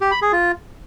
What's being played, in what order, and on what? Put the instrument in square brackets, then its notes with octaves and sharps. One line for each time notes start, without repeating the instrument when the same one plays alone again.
[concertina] G4
B5
G#4
F4